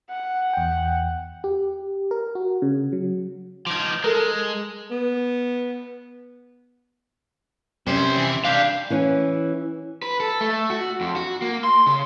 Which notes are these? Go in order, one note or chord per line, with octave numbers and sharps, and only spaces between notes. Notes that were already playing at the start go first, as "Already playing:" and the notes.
F#5
E2 G5
G4
A#4
F#4
C#3
F#3
F3 D#4 D6 G#6
G#3 A4 A#4
B3
C2 C3 C#4 C5
E3
D4 G4 F5
E3 C#4
B4
A4
A3
F#4
F2
F#4
A#3
C6
C#3